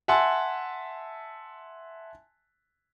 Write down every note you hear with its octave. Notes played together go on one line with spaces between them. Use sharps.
E5 F#5 G#5 A5 C6